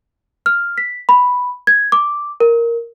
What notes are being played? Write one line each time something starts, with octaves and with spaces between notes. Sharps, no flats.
F6
B6
B5
G#6
D6
A#4